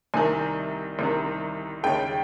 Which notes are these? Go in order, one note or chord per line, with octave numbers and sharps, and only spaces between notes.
C2 C3 D#3 G#5
C2 C3 D#3
D#2 C#3 G#3 G5